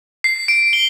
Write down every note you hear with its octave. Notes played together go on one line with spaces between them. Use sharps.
C7
D7
G7